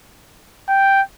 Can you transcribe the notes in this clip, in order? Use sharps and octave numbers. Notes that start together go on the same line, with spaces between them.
G5